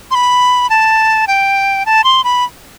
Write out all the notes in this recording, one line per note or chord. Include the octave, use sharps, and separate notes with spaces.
C6
B5
A5
G5
A5
C6
B5